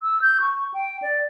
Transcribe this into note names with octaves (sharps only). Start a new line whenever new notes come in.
E6
G6
C#6
G5
D5